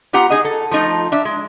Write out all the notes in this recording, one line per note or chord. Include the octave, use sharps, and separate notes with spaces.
B3 F4 G4 F#5 A#5
D#4 G#4 D#5
A4
F3 A3 D#4 F4
D4 E5
G#3